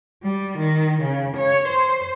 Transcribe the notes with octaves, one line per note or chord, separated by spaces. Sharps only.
G3
D#3
C#3
C#5
C5